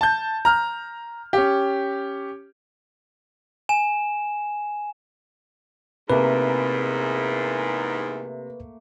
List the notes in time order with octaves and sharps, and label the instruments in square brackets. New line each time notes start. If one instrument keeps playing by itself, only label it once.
[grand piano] A5 G6
A#5 F6
C#4 G4
[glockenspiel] G#5 E7
[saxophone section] E2 G#2 [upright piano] C3 [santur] A3 A#3 [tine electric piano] B4